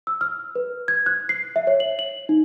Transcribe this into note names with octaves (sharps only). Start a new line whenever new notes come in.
E6
F6
B4
G#6
F#6
C7
E5
C#5
F#7
F#7
D#4